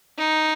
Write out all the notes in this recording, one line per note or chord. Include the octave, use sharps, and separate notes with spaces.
D#4